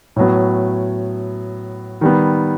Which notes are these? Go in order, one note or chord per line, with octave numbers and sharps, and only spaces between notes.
A2 F#3 B3
D#3 G3 B3